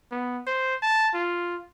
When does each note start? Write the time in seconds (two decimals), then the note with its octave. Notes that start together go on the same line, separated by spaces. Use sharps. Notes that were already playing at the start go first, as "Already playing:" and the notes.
0.12 B3
0.47 C5
0.83 A5
1.14 F4